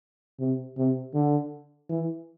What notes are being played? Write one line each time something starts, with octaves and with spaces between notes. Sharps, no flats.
C3
C3
D3
E3